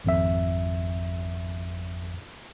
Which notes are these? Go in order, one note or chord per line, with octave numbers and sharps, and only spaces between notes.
G#1 F2 E5